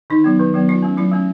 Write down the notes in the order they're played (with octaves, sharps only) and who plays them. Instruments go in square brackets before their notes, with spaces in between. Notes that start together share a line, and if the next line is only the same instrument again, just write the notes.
[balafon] D#3 D#4
F#3 B3
D#3
F#3 B3
F#3 F4
A3 C#4
F#3 E4
A3 C#4